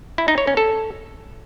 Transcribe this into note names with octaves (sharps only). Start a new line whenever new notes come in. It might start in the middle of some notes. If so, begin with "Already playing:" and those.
E4
D#4
C#5
C#4
A4